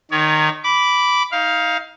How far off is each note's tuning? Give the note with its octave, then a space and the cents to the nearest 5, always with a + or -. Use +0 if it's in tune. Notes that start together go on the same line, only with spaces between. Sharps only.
D#3 -15 D#4 -10 C#5 +25
B5 +0 D6 -15
D#4 +30 F5 +0